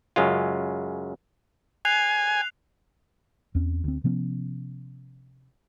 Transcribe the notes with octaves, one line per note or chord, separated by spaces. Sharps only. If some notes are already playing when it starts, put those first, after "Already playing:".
F#2 C#3 G#3 F4
G#5 F#6 C7 F7
E2 C4 C#4
D2 C4
C3 F3 B3 C#4